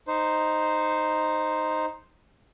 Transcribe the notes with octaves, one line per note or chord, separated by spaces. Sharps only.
D#4 C5